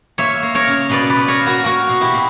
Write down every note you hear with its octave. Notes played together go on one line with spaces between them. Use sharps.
A#3 C#5 E5
A#3
A#4 C#5
C#3
B2 B4 D5
B4 D5
B2
A#4 C#5
A#3
F#4 A#4
A#3 F#4 A#4
B2
E4 G4
B2